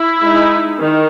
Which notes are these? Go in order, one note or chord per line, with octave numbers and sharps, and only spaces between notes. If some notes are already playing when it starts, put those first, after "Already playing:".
Already playing: E4
G#3 D#4
D#3